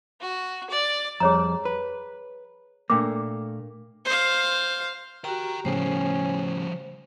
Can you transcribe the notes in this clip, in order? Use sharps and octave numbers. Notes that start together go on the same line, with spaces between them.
F#4
D5
F2 G3 G#4 C#5 A#5
B4
A#2 A3 A#3 D4 G5 D6
C5 F5
F#4 G4 A#4 G5 A#5
A2 C#3 F3 G3 C#4 C5